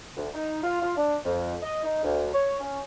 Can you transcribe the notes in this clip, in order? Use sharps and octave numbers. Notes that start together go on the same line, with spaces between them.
D2
D#4
F4
F4
D4
F2
D#5
D#4
D2
C#5
C#4